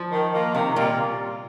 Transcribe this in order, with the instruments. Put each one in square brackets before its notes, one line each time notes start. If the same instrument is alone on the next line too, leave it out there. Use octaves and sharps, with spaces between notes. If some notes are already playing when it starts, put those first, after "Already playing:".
Already playing: [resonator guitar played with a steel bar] F3
[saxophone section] D#3
A#3 F4
[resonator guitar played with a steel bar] C3 [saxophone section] D#3
[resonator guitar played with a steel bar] A#2 [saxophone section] G3 A#3 F4